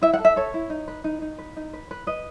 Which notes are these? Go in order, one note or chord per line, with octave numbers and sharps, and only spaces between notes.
E4 E5
F#5
A4
E5
A4 C#5
E4
D#4
B4
D#4
D#4
B4
D#4
B4
B4
B4 D#5